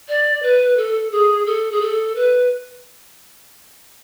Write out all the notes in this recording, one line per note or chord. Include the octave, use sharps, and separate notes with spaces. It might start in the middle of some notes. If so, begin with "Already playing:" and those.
D5
B4
A4
G#4
A4
G#4
A4
B4